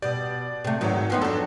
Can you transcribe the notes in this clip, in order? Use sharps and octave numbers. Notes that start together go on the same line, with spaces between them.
B2 G3 D5
C3 A3
E2 G#2 D#3 F#3 C#5
F3 B3 D#4 G5 C6
F2 F#3 D4 A4